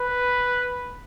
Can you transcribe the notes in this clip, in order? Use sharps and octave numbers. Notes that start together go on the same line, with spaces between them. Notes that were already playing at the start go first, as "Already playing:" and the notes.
Already playing: B4